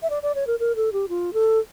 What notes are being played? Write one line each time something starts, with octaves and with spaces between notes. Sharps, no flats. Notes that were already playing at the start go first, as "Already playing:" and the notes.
E5
D5
D5
C#5
A#4
A#4
A4
G4
F4
A4